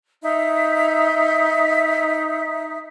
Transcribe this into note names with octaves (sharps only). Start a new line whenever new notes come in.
D#4 E5